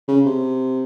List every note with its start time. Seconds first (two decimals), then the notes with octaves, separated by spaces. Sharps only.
0.08 C#3
0.25 C3